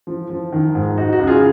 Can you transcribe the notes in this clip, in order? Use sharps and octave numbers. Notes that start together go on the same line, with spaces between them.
F3
F3
D#3
G#2
D#4 F#4
F#4
C#2
F4 G#4